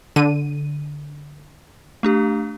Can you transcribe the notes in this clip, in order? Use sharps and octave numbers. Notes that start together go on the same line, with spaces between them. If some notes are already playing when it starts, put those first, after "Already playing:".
D3 D#7
A3 D4 G4